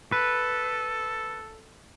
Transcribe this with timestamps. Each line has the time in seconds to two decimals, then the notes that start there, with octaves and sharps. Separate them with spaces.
0.12 A4 B4